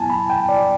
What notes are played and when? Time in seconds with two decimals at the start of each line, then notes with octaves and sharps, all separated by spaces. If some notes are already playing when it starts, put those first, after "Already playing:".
Already playing: F#3 B3 E4 G#5 A5
0.10 B5
0.30 G5
0.49 D5